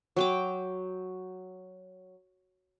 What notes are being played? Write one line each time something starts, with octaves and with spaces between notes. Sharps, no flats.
F#3 G5 D6